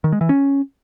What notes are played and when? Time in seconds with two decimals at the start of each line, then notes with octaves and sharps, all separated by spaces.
0.04 D#3
0.12 G#3
0.21 E3
0.29 C#4